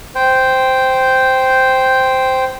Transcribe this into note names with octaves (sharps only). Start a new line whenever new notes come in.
C5 G5